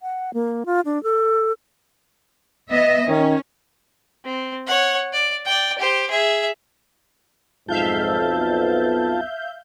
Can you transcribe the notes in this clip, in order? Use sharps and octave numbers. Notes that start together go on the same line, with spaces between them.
F#5
A#3
F4
D4
A4
B3 D#5 E5
D#3 C#4
C4
C#5 F#5
D5
D5 G5
G4 C5
G#4 E5
B1 F2 G#2 F4 E5 F5 A5 G6
B3